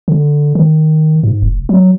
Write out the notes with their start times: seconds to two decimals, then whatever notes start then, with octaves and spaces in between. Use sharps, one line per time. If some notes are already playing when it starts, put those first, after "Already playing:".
0.08 D3
0.55 D#3
1.24 G#2
1.42 F1
1.69 F#3